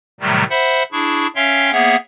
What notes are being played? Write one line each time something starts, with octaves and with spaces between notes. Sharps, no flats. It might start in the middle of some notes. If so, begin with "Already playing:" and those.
A2 C3 D#3 F#3 G3 A3
C5 E5 F#5 B5
D4 E4 G#4 C#6
C#4 C#5 E5 F5 G5 C6
A#3 B3 G#4 C#5 E5 F#5